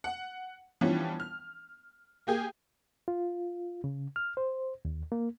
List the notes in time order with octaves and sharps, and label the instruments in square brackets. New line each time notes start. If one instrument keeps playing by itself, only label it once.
[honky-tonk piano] F#5
E3 F3 G3 B3 C#4 D4
F6
A#3 G4 G#4
[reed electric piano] F4
C#3
F6
C5
D#2
A#3